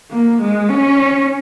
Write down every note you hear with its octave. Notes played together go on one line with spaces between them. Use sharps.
A#3
G#3
C#4